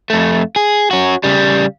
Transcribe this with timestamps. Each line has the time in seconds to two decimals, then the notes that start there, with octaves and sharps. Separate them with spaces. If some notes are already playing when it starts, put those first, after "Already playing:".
0.10 F2 A3
0.56 G#4
0.91 C#4 F#4
1.24 C#3 G3